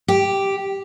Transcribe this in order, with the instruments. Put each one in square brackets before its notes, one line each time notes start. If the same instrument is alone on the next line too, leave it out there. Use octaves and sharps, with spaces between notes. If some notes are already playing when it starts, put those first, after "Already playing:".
[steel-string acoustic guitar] G4